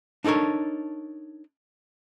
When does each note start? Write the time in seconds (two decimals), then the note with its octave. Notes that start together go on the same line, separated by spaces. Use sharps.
0.24 D4 D#4 A4 A#4 C#5